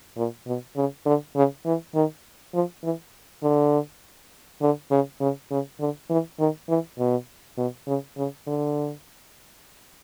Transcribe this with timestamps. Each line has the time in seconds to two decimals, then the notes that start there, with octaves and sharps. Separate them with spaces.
0.17 A#2
0.47 B2
0.76 C#3
1.06 D3
1.36 C#3
1.66 E3
1.95 D#3
2.54 F3
2.84 E3
3.43 D3
4.62 D3
4.91 C#3
5.21 C#3
5.50 C#3
5.80 D3
6.10 E3
6.39 D#3
6.69 E3
6.98 B2
7.58 B2
7.87 C#3
8.17 C#3
8.47 D3